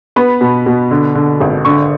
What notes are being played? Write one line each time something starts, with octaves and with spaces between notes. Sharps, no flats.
B3 B5
B2
B2
D3
D3
G#1
D3 C#6